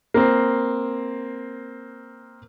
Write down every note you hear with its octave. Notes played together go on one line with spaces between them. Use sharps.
A#3 C4